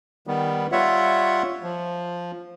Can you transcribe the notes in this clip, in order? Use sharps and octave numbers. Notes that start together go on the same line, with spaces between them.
D#3 G3 B3
G3 F4 C#5 E5 F#5
F3